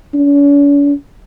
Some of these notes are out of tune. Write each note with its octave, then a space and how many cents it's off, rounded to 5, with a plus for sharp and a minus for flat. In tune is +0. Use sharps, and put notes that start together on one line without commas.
C#4 +45